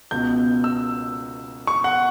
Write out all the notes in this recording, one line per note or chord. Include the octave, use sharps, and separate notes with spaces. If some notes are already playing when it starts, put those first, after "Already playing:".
C#2 B2 G6
E6
C#6
F#5